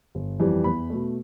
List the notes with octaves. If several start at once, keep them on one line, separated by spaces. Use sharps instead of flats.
G1
F2 E3 G3
E2 B5
B2 A3